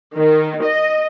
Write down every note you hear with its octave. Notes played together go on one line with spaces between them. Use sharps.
D#3
D#5